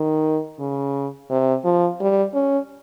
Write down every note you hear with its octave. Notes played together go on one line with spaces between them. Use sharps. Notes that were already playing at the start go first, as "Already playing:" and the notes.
Already playing: D#3
C#3
C3
F3
G3
C#4